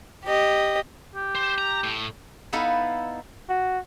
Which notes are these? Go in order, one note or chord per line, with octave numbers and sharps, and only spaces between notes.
G4 D#5
G4
C5
A#5
A2
B3 D#4 E4 A4 F5
F#4